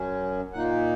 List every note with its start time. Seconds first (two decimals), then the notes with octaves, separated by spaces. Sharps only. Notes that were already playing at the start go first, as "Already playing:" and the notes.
Already playing: F#2 F#3 C#4
0.53 A#2 A#3 D#4 F#5